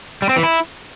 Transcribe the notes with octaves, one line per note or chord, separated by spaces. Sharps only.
G3
C4
E3
E4